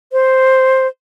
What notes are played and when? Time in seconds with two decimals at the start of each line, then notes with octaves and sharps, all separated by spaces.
0.12 C5